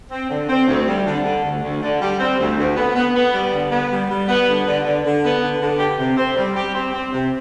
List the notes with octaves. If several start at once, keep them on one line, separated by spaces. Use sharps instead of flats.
C4
D3
C4
D2
G3
D3
D3
D2
D2
D3
G3
C4
D2
D2
B3
B3
B3
G3
D3
B3
G3
G3
B3
D3
D3
D3
D3
B3
D3
D3
G4
C3
C4
G3
G4
C4
C4
C3